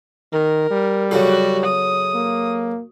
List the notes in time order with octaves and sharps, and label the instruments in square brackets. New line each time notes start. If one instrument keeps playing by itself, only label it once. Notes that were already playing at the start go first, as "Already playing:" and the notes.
[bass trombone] D#3 [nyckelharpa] A#4
[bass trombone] G3
[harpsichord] F#2 C#3 A4 [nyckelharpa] F#4
[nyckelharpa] D#6
[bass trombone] A#3